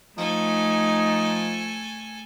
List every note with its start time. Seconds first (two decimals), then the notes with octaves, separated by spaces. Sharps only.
0.18 F3 A3 D#4 A4 G#5